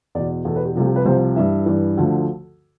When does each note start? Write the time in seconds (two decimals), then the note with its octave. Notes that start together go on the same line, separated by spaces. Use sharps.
0.15 E2 B2 D5
0.45 E2 B2 A4
0.56 B4
0.65 G4
0.75 C2 C3 F3 A4
0.86 G4
0.96 B4
1.05 C2 C3 F3 C5
1.36 G2 E3 E5
1.66 G2 E3
1.97 D2 D3 F3